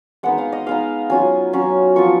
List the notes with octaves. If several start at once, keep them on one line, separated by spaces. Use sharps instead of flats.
G#3 B3 D#4 F#5
F5
D#5
G#3 B3 D#4 F5
F#3 C#4 F4 G#5
F#3 C#4 F4
F3 B3 F4 C#6